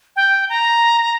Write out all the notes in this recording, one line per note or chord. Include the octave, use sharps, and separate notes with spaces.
G5
A#5